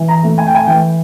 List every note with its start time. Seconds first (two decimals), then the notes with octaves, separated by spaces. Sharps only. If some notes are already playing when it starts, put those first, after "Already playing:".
Already playing: E3
0.08 A#5
0.23 A3
0.38 G#5
0.47 G5
0.55 G#5
0.66 E3 G5